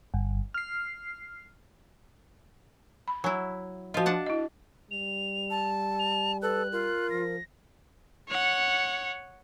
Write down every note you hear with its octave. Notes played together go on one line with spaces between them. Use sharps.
G1
F6 C7
B5
F#3 E4 G#5
F3 F4 F#4 D#5
D4 F#5 A5
E4 D#5
G3 F7
A5
F7
A4 B4 F#6
F4 A#4
F3 A#6
C#5 F#5